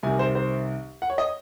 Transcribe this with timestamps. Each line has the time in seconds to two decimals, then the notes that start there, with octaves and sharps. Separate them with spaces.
0.03 C2 C3 D#3 G#5
0.19 C5
0.35 C5
1.02 F#5
1.10 C#5
1.18 D#5